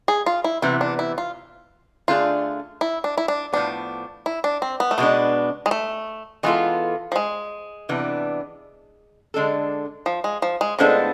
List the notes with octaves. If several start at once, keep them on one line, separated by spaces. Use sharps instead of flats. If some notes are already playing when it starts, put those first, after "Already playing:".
G#4
F4
E4
C3 E3 B3 E4
D4
E4
F4
D3 A3 D4 F4 G#4
E4
D4
E4
D4
A2 F3 B3 D4
E4
D4
C4
B3
A3
B2 G#3 B3 D4
G#3
A3
E3 G#3 B3 F4 A4
F3
G#3
C3 E3 B3 D4
D3 G#3 D4 A4
F3
G#3
F3
G#3
A2 F3 G#3 B3 D4 A4